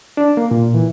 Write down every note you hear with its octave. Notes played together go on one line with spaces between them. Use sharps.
D4
A#3
A#2
E3